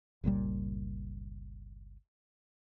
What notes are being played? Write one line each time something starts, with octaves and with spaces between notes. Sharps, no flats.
G1 C#2 A#2 G3